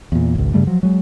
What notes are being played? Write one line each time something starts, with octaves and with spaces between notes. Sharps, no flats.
E2 A#2
G#1 C#2
G2 C#3 G3 A3
F3 F#3
F#3 G#3